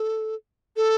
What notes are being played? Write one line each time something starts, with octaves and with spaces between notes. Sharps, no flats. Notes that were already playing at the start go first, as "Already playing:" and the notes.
Already playing: A4
A4